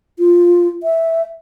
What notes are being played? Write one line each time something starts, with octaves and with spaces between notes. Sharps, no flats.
F4
E5